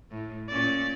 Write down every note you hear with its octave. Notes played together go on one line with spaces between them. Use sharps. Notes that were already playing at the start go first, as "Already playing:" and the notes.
A2
A#2 C#4 D5